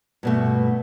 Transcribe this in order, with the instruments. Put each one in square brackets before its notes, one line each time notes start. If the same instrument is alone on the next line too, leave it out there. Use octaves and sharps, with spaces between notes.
[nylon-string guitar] G2 B2 A3